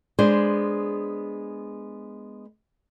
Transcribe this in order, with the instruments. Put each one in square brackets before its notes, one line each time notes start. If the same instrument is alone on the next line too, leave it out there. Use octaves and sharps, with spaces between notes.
[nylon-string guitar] G#3 B3 D4 G#4 C5